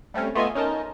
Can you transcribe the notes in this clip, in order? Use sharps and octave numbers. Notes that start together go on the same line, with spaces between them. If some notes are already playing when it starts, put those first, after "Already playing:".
G3 A3 C4 C#4
A3 B3 F4 D#5 E5 G#5
C#4 D#4 A#4 D#5 A5